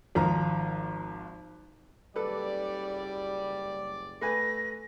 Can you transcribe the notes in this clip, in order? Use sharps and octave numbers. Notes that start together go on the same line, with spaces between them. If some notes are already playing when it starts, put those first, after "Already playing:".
G#1 F3 A#5
F#1 G3 A4 B4 D5
A3 B4 G#5 A#6